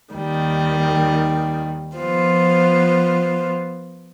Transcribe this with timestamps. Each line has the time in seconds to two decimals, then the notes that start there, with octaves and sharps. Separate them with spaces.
0.13 D#2 D#3 G3
1.98 F3 B3 F4 C5